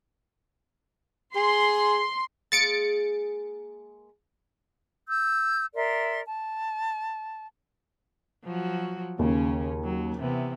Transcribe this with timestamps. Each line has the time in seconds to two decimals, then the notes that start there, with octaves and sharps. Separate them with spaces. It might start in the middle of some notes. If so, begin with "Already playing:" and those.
1.35 G#4 C6
2.52 G#3 A#3 G#4 A6 C#7 D7
5.08 E6 G6
5.74 A#4 D5 E5 C6
6.26 A5
8.44 F3 F#3 F#4
9.19 D#2 C#3 C#4
9.83 F#3
10.18 C3 E3 B3